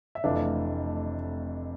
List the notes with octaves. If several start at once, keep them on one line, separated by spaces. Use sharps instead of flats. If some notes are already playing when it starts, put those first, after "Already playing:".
E5
F1 F2 E3 A3 D4 F5